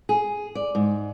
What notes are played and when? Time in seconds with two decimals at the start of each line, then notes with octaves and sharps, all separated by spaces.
0.09 G#4
0.55 D5
0.75 G#2